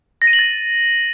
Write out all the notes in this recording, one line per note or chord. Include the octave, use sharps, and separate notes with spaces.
A#6
D#7
F#7
A6